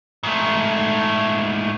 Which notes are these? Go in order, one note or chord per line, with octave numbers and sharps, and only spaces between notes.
G#2 A3